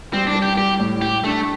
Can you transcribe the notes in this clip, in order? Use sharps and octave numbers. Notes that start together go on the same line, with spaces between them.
G3 C4
D4
G3
G4
G3 G4
A2
G3 G4
A3 D4